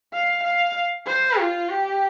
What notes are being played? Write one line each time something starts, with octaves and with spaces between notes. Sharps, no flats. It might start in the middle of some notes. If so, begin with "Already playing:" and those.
F5
F5
C5
F4
G4